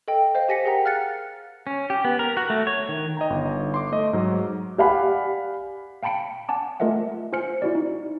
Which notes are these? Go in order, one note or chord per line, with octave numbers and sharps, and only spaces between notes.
A4 D#5 G5
C5 D#5 F5
G4 G#5 A#6 B6 C#7
G#4 A#4 F#5 G5 A#5
F5 F6 F#6 A6 C#7
C#4
G4
B3
A#4
F#4
A3
C#5
D#3
D#5 G5 A#5
G1 D#4
C6 D6
A3 D#5
G#2 F#3
G4 D5 F5 F#5 G#5 B5
F5 G5 A5 B5 C#7 D7
F#5 G#5 A5 D6
A3 F4 A#4 D#5 E5 F#5
F4 C5 G#5 F6 C#7
E4 F#4 D5
D#4